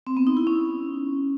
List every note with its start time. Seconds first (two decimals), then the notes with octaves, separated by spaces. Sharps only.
0.07 C4
0.17 B3
0.27 D#4
0.37 E4
0.47 C#4